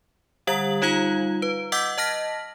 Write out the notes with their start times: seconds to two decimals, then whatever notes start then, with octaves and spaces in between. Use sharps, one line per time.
0.47 D3 G3 F#5 F#7
0.82 G3 D#4 F4 F5 A#5
1.42 B4
1.72 D#5 F#5 D6 E6 G6 B6
1.98 D#5 A5 F6 A#6 B6